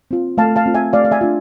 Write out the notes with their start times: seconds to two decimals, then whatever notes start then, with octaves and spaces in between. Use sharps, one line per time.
0.11 C4 F4
0.38 A3 F5 A5
0.56 F5 A5
0.66 C4 F4
0.74 E5 G#5
0.93 A3 D5 F5
1.05 F5
1.11 E5 G#5
1.21 D4 F4